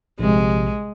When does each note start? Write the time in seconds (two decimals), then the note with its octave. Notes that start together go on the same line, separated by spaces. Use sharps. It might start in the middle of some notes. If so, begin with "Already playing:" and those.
0.19 A#1 C3 G#3